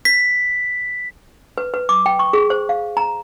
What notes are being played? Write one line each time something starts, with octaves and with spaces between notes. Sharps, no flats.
B6
B4
B4
D6
G5
C#6
G#4
C5
F5
A#5